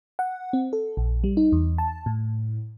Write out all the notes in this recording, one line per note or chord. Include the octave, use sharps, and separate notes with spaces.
F#5
C4
A4
A#1
G3
D#4
E2
A5
A2